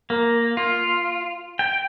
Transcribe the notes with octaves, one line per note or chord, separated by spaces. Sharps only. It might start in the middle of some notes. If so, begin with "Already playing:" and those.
A#3
F4
G5